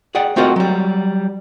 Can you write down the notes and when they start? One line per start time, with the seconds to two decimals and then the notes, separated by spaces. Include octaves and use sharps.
0.15 G#4 D5 F#5 G5
0.36 A3 C4 F4 F#4 A#4 D#5
0.56 F#3 G3